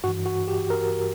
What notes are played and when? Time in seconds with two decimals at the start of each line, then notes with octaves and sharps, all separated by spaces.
0.04 G2 E3 F#4
0.26 F#4
0.48 G4
0.70 A#4